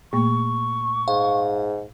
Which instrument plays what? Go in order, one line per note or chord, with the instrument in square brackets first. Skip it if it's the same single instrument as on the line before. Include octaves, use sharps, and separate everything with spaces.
[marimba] A#2 A3 A#3 [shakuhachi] C#6
[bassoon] G#2 [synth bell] F5